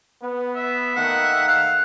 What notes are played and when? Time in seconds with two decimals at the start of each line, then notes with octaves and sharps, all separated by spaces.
0.21 B3
0.56 E5
0.96 D#3 A3 A#3 F#5
1.48 F5 F#6